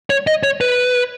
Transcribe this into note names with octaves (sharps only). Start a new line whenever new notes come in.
C#5
D#5
C#5
B4